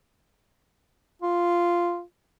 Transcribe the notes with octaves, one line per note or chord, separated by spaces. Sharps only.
F4